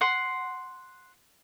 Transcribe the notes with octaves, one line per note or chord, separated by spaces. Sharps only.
F#5 C6